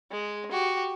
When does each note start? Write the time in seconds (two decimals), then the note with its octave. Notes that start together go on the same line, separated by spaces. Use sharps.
0.11 G#3
0.51 F#4 G4